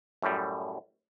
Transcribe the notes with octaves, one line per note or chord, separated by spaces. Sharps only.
F#2 A2 G3